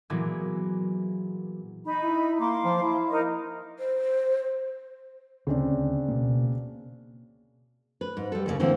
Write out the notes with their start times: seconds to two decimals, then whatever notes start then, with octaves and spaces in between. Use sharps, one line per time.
0.10 A#2 E3 F#3 G#3 A#3 B3
1.85 D#4 B5
2.03 E4
2.40 A#3 F5 C6 D6
2.65 F3
2.82 E4
3.10 D#4 A#4 D#5
3.79 C5
5.47 D2 C#3 C4 D4
6.08 B2 A#3
8.01 B4
8.17 G#2
8.32 G3 A4
8.46 D#2 A2 C#3
8.60 D3 E3 A#3 C4